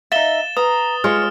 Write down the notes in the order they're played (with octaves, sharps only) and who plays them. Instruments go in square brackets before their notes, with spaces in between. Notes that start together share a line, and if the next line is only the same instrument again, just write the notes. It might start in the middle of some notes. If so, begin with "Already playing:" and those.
[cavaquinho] D#4 E5 [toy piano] F5 [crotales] A6 E7 G7
[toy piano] B4 [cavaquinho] A#5 [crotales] D#6
[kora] G#3 F4 [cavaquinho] C#5 [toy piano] C6 [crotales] F6